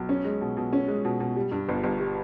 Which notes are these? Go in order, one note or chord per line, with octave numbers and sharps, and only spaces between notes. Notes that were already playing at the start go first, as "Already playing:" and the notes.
Already playing: B1
C#4
G#3
B2
B2
C#4
G#3
B2
B2
G3
G2
G1
G1
G3